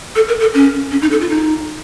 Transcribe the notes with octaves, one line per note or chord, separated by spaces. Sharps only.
A4
A#4
A4
C#4
C#4
D#4
A4
F4
D#4